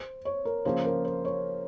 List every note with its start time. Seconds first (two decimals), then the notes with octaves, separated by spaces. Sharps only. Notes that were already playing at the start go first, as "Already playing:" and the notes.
Already playing: C5
0.25 C#5
0.45 A#4
0.65 C#3 F3 A#3 C#4 C5
0.85 A#4
1.05 C5
1.25 C#5